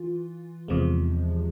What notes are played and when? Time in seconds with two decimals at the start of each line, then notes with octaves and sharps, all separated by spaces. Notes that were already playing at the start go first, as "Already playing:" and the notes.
Already playing: E3 F4
0.68 E2 C3 F3 G#3